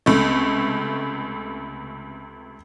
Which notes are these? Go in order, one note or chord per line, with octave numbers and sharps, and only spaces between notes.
C#2 C3 A3